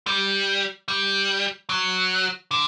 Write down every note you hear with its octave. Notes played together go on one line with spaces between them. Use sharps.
G3
G3
F#3
D3